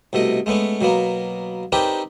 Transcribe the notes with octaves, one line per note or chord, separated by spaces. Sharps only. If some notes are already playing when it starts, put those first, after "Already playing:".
C2 B2 A3 D#5
G#3 A3 B3 C#4
B2 F#3 A#3 B3
C4 D4 D#4 G4 A#4 B4